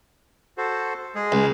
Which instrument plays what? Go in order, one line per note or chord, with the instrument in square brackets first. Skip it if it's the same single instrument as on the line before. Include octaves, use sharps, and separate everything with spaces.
[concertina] F#4 A4 C5
G#3 G#4
[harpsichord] C#2